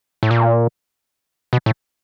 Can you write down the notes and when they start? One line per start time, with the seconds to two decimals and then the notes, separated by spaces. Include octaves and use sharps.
0.23 A2
0.31 A#2
1.53 B2
1.66 A2